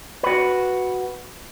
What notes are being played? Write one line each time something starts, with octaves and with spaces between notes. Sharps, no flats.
F#4 B4